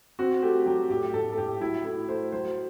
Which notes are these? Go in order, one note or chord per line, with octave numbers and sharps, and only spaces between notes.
C4 F#4
A3 G4
F#3 G4
A2 G4
A2 A4
A4
A2 G4
F#3 E4
A3 E4
A3 C5
F#3 C5